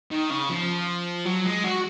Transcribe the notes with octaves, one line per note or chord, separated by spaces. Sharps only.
D#3
C#3
F3
F#3
G#3
F#4